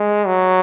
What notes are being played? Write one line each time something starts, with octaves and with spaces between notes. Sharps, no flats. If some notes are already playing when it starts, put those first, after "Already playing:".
Already playing: G#3
F#3